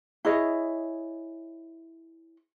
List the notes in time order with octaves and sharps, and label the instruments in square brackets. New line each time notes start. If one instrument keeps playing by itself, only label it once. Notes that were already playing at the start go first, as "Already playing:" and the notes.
[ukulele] E4 G#4 C#5 D#5